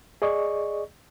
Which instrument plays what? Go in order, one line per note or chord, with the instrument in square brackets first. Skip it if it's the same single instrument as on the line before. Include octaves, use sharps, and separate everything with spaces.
[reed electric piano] G#4 D5 D#5 C#6